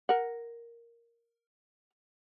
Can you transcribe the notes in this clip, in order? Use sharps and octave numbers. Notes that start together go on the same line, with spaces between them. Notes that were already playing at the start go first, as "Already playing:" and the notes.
A#4 F#5